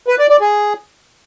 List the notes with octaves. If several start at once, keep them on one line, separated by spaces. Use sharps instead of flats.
B4
D5
D5
G#4